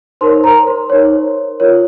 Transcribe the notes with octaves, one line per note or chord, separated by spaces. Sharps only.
D#4 A#4 C5 C#5 C6
A#4 A#5
C5 C6
D#4 A#4 C#5
F4 A#4 C#5